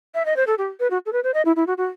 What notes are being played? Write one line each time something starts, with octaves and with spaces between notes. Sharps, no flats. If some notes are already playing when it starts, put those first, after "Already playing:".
E5
D#5
C5
A4
G4
B4
F#4
A4
B4
C5
D#5
E4
E4
F#4
F#4